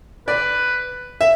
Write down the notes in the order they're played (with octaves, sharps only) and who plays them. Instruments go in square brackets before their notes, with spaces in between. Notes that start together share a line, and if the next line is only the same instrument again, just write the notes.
[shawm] B4 [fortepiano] D5
[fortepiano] E5